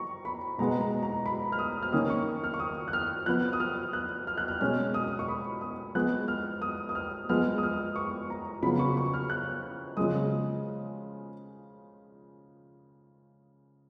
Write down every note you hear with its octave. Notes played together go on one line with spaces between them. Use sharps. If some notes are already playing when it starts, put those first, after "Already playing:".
Already playing: A#5 C#6
B5
B2 G#3 B3 A#5
A#5
A#5
B5
F6
D#6
F6
D#3 A#3 C#4 D#6
C#6
F6
C#6
D#6
F#6
F6
F3 B3 F#6
D#6
F6
F#6
F6
F#6
F6
B2 G#3 C#4 F6
D#6
C#6
B5
D#6
F3 G#3 B3 F#6
F6
D#6
D#6
F6
F3 G#3 B3 F6
D#6
F6
C#6
A#5
C#3 F3 B3 B5
C#6
C#6
F6
F#6
C#3 F3 G#3 D#6